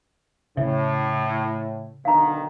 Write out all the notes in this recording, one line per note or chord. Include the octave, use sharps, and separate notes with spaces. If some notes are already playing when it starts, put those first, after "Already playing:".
A2 C#3 E5
B1 D3 D#3 F5 A#5